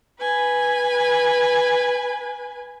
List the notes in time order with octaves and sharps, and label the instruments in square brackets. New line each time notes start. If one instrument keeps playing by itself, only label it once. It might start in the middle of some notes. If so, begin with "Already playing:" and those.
[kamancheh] B4 G#5